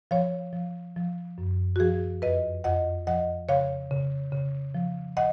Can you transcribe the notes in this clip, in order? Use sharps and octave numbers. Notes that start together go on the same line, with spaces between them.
F3 C#5 F5
F3
F3
F#2
F#4
F3 G#4
F2 B4 D#5
F2 D#5 F#5
F3 D#5 F#5
C#3 C#5 F5
C#3
C#3
F3
D#5 F#5